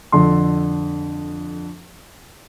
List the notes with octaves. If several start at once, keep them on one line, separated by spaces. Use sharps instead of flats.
F2 D3 A4 C6